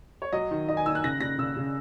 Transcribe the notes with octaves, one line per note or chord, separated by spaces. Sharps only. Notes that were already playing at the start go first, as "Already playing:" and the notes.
C#5
F#3 D#5
D#3
D#3 D#5
G#5
D#3 E6
F#6
C#3 A#6
C#3 A#6
C#3 E6
C#3